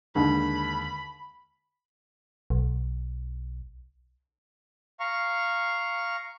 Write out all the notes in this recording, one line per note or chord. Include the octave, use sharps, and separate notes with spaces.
D#2 D3 G#3 B5
B1
F5 A#5 C#6